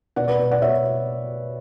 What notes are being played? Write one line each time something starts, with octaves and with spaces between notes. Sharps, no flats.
B2 D5 F#5
B4 D5
B2
D5 F#5
B2 C#5 E5